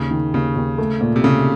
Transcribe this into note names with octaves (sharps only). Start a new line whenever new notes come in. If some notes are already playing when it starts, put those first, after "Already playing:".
Already playing: D#2 C#3
D#3
D#2 C#3
D#2
A3
A#2
C3
C#3 A3